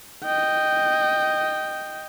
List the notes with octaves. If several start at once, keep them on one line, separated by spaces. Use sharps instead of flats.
D#5 G5